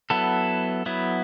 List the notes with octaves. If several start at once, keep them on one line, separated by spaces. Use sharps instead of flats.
F#3 B3 E4 A4
F#3 B3 E4